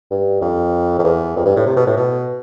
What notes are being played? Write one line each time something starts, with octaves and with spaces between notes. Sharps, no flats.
G2
F2
F2
E2
F2
G2
A2
C3
B2
A2
B2